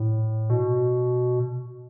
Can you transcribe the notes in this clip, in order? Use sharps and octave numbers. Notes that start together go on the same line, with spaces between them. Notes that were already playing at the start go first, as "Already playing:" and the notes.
Already playing: A2
B2